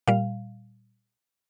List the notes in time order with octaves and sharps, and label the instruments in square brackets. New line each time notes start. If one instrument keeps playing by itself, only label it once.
[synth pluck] A#2 G3 F5